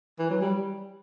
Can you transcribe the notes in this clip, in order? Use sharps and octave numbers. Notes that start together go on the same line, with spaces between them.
E3
F#3
G3